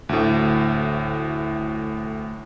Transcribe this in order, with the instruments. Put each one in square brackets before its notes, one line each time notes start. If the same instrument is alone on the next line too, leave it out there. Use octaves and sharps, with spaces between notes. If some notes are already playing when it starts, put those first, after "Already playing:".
[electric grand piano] D2 A2